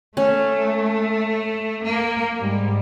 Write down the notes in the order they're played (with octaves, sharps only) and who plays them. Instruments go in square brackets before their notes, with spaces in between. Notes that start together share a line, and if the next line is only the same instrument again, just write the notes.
[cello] A3 [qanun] C#4
[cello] A#3
G#2 G3